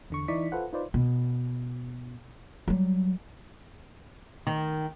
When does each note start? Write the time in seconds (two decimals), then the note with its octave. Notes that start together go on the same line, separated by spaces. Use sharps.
0.10 E2 D3 C#6
0.28 E3 D#4 E4 D5 C#6 B6
0.52 F4 A4 B4 C5 F#5
0.73 D#4 F4 B4 C5 D5
0.94 B2
2.68 F#3 G3
4.47 D#3